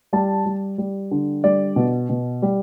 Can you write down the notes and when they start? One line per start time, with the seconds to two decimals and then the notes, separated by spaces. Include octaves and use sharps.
0.13 G3 A5
0.46 G3
0.78 G3
1.11 D3
1.44 G3 D5
1.76 B2
2.09 B2
2.42 G3